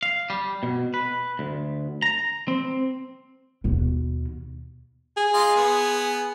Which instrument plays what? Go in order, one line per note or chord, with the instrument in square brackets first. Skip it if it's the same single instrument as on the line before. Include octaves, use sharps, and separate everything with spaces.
[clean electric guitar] F5
G3
B2
B4
D2
A#5
C4
[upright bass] D#2 B2
[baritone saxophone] G#4
[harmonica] F4 D#5 C6
B3